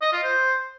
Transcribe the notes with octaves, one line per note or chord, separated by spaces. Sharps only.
D#5
F4
C5